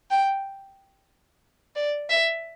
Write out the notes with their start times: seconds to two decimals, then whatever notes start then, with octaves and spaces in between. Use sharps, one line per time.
0.11 G5
1.76 D5
2.10 E5